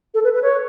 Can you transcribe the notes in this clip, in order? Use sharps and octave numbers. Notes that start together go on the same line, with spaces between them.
A4
B4
B4
C#5